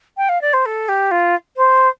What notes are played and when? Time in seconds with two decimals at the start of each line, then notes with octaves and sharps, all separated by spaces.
0.17 G5
0.29 F5
0.41 D5
0.53 C5
0.66 A4
0.89 G4
1.11 F4
1.57 C5